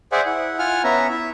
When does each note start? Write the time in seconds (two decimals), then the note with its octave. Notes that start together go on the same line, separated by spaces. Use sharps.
0.12 G#4 C5 D5 E5 F#5 G#5
0.26 E4 F#5
0.59 F4 F#5 G#5 F6
0.84 B3 C#4 E5 A#5
1.10 E4 E5